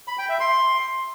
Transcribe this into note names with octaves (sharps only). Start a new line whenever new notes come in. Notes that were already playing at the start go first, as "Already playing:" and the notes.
B5
G5
E5
C6